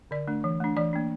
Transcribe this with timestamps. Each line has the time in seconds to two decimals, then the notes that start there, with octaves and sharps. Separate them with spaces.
0.11 D3 D5
0.28 A3 D4
0.44 E3
0.60 A3 D4
0.77 E3 D5
0.93 A#3 D4